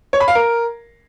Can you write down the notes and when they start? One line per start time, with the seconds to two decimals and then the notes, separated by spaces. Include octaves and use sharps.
0.13 C#5
0.20 B5
0.28 F5
0.35 A#4